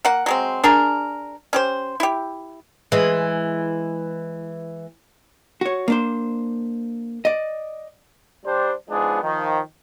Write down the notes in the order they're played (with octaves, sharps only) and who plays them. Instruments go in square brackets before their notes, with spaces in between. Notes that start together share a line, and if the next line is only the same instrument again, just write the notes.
[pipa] A#3 F#5
F#3 G#3 C4
D4 G#4 A#4
C#4 G4 C5
E4 G4
[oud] E3 G#3
[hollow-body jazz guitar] F#4 C#5
A#3 D4 C5
D5 D#5
[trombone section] G3 D4 C5
F3 G#3 B3 D4 D#4 G#4
D#3 F3